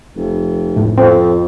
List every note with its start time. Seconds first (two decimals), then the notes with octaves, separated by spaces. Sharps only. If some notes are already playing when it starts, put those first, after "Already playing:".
0.16 F1
0.76 A2
0.98 F2 C4